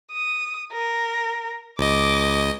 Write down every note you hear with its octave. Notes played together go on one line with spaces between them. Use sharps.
D#6
A#4
C#2 D#5 D6